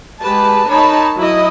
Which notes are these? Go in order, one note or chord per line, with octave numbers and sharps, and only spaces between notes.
G#3 G4 B4 A5
D#4 A#4 C#5 A5 B5
F#3 E4 D#5